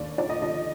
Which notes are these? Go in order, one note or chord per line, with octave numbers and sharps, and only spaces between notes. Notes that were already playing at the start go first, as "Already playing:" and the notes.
Already playing: D#2 D3 D5
F3 D5
D#5
F3 D#5